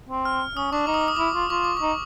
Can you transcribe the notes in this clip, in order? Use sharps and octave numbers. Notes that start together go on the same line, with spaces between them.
C4
F6
C#4 D#6
D4 C#6
D#4 D6
D#6
D6
D#6
E4 D6
F4
F4 C#6
D6
D#4 C#6